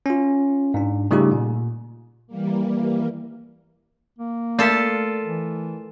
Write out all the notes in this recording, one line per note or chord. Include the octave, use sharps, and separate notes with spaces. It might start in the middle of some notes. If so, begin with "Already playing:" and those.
C#4 F4
G#2 D4
C#3 G3 A3 D#4 F4 G4
A#2
E3 G3 A#3
A#3
A3 F4 A4 A#4 B6
E3